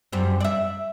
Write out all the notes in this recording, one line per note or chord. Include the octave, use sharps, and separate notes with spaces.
F#2 G3 C4
D5 E5